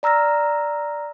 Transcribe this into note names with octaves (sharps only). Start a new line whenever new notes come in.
D5 A#5 E6 F6 A#6